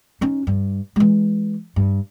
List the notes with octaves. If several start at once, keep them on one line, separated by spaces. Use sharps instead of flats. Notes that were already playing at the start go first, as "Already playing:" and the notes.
C#4 D#4
G2
E3 G#3
G2